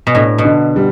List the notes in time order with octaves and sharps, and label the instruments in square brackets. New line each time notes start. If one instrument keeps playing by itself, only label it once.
[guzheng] B2
[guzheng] A2 [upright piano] D4
[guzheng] B2
[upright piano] D3
G3